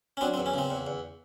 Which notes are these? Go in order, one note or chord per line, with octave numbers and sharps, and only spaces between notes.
C#4
F#3 C4 D4
C4
E2
C#4
C#3 C4
E2
E2